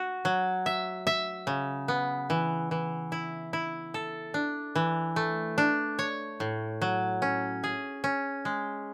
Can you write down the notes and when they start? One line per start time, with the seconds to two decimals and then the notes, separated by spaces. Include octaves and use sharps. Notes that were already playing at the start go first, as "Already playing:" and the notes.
Already playing: F#4
0.25 F#3
0.66 E5
1.07 E5
1.47 C#3
1.88 B3
2.30 E3
2.71 E3
3.12 E4
3.53 E4
3.94 A4
4.34 D4
4.76 E3
5.16 A3
5.58 D4
5.99 C#5
6.40 A2
6.82 F#3
7.22 C#4
7.64 G#4
8.04 C#4
8.45 G#3